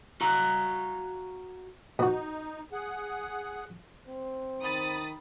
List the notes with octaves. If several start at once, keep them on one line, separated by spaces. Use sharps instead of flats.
F#4 F5 A#5
B2 D#4 F#4
G#4 F#5
C4
D#3 B5 D#6 A6